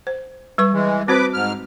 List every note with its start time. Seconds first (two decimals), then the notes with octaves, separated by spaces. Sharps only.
0.07 C5
0.58 G3 B4 C#6
0.73 E3 G#3
1.08 C4 F#4 B4 C5 D6
1.34 G#2 F6